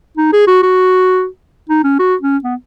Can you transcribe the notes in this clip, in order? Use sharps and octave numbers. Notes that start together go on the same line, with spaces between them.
D#4
G#4
F#4
F#4
D#4
C#4
F#4
C#4
B3